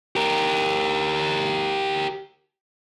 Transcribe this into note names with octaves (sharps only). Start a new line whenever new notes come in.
G4 A#4